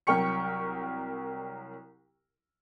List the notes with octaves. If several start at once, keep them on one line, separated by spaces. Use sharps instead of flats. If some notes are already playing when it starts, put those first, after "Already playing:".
C2 F#3 A#4 G5 C#6 C#7